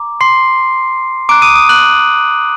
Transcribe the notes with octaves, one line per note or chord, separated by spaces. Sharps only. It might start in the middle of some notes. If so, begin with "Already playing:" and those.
Already playing: A#5 D6
C6 C7
A#5 D6 F#6 D7
D#6 D#7
D#6 D#7
F#6 F#7